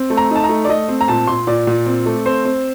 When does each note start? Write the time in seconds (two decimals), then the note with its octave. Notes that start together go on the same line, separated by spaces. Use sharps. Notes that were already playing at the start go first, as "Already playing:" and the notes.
Already playing: C4
0.10 A3
0.17 A#5
0.31 D#4 A5
0.44 A#5
0.49 A3
0.65 D5
0.69 A3 D#5
0.89 C4
1.01 A#5
1.08 A#2 A5
1.27 A#2 C6
1.47 A#2 D5
1.67 A#2
1.86 C4
2.06 A3
2.26 C4 C5
2.45 C4